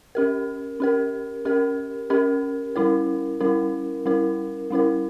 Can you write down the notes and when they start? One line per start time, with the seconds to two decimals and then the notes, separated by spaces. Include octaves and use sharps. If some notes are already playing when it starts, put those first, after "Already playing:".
0.15 C#4 G4 A#4
0.80 C#4 G4 A#4
1.45 C#4 G4 A#4
2.10 C#4 G4 A#4
2.76 G3 C#4 E4 A#4
3.40 G3 C#4 E4 A#4
4.06 G3 C#4 E4 A#4
4.71 G3 C#4 E4 A#4